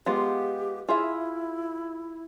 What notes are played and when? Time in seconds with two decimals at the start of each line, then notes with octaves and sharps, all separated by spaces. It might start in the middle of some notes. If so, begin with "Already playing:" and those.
0.06 G#3 B3 F4 G4
0.89 E4 F4 G#4 E5